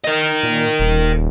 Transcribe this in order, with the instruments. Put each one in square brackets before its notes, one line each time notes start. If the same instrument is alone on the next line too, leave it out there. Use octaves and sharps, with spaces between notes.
[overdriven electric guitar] A#4 D#5
[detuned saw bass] A#2
D#1